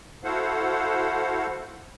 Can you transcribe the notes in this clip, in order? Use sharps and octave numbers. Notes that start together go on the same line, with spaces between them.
E4 F#4 A4 C5 F5 F#5